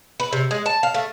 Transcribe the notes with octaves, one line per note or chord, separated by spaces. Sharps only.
B4
C3
G#3
A5
F5
A3